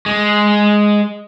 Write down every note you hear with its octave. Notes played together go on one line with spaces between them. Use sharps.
G#3